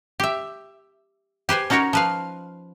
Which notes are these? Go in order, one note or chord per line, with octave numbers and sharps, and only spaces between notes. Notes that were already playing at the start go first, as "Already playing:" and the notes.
G4 E5
G4 B4 C5 G#5
C#4 D#4 F#4 A#4 C#5
F3 B4 F5